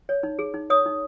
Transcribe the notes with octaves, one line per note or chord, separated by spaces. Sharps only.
C#5
D#4
G#4
D#4
C#5 D#6
D#4